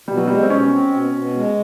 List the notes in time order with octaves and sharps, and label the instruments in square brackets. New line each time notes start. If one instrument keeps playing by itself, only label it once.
[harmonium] B2 [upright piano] G3
[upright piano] F#3
[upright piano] G3 [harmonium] G#3
[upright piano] C4
[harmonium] B2 [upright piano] C#4
[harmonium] C4
B2
B2
G#3